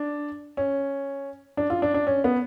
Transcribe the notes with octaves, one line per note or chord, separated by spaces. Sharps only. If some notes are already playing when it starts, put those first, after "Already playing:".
Already playing: D4
C#4
D4
F4
D4
D4
C#4
B3